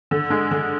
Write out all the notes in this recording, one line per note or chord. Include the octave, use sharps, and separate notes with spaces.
D3
G#3
D3